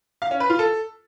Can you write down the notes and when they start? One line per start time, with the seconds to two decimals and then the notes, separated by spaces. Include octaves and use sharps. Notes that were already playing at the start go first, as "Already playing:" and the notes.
0.22 F5
0.31 C#4
0.40 B4
0.50 F4
0.59 A4